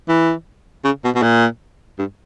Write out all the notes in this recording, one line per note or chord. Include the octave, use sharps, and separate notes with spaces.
E3
C#3
B2
B2
A#2
G2